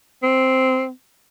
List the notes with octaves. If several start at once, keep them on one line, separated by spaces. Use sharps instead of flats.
C4